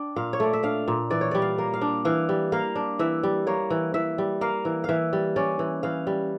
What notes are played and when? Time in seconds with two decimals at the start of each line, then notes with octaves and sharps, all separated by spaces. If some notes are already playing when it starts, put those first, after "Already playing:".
Already playing: D4 G5
0.16 A#2 F5
0.33 C#5
0.40 A3 D5
0.53 E5
0.63 D4 F5
0.88 A#2
1.11 E3 D5
1.21 C#5
1.31 G3 D5
1.42 F5
1.58 A#3
1.74 F5
1.81 D4
2.05 E3 F5
2.29 G3
2.52 A#3 F5
2.75 D4
2.99 E3 E5
3.23 G3
3.47 A#3 C#5
3.70 E3
3.94 E3 E5
4.18 G3
4.41 A#3 F5
4.65 E3
4.84 E3 E5 F5
5.13 G3
5.36 C#4 D5
5.59 E3
5.83 E3 F5
6.07 G3